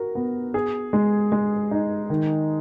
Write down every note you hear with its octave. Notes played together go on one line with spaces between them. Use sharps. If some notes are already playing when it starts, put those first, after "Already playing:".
Already playing: F#4 A#4
B3
G#4
G#3
G#3
D#4
D#3